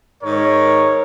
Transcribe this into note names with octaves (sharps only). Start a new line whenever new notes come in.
G#2 D#3 A#4 C#5